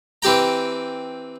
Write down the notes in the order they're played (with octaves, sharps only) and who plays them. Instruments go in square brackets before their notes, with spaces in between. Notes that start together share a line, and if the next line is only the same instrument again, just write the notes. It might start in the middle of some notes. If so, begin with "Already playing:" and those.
[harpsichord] E3 C4 G4 G5 A#5